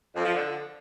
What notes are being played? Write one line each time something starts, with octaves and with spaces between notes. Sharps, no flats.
F2
F3
D3